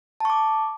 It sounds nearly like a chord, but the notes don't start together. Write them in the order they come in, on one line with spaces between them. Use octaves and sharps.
A5 C#6 D6